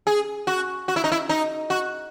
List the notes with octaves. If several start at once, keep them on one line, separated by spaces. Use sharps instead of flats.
G#4
F#4
F#4
E4
D#4
E4
D#4
F#4